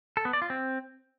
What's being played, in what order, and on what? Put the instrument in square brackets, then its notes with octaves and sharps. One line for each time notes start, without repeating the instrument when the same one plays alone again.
[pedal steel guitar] A4
B3
D5
F4
C4